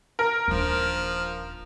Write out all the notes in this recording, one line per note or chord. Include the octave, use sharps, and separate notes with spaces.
A#4
D#1 F3 D4